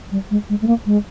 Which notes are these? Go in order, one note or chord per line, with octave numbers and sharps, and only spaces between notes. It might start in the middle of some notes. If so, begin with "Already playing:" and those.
G3
G#3
G#3
A3
A#3
G#3